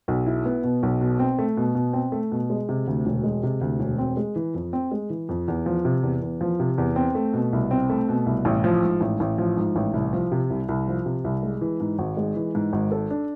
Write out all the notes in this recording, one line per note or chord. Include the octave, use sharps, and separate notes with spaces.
B1
E4
B3
B2
B1
B2
C4
A3
B2
B2
C4
A3
B2
G#3
C3
D2
E1
G#3
C3
D2
E1
C4
G#3
E3
F2
C4
G#3
E3
F2
E2
F3
C3
E2
E2
F3
C3
E2
C4
A3
B2
C2
C4
A3
B2
C2
A1
F3
G#2
A1
A1
F3
G#2
A1
C2
F3
C3
C2
C2
F3
C3
C2
G#3
E3
G#2
G#1
G#3
E3
G#2
G#1
A4
D4